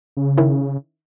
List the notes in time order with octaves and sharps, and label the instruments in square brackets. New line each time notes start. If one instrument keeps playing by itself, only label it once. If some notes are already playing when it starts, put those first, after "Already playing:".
[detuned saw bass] C#3
[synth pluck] D#3 C#4 E4